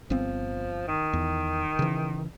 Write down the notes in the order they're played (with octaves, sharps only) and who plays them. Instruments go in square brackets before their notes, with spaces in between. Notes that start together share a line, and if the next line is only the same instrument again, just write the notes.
[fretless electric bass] G1 B3 C4 [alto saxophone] F3
[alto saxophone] D#3
[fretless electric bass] E2
C#3 E3